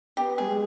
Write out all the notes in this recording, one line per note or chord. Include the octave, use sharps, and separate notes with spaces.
B3 G4
G3 G#4
G#3